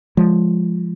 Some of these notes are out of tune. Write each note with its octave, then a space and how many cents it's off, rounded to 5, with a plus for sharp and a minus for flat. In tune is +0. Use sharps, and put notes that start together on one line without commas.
F3 +0 G#3 +0